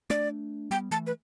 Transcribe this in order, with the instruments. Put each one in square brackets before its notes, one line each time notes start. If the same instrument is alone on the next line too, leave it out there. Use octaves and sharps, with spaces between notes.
[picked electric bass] A3 D4 [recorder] D5
[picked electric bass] G3 B3 [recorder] G5
[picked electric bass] E3 A3 [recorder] A5
[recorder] B4